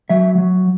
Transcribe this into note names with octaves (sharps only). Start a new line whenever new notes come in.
F#3 E5
F#3